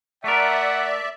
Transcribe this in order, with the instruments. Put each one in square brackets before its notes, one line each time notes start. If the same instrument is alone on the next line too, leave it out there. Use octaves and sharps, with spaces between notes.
[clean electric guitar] A3 A#4 [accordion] D5 E5 [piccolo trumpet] F#5